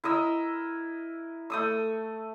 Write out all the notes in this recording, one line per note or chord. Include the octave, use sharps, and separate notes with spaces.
E4 A#4 D#5 E6
A3 D#6 E6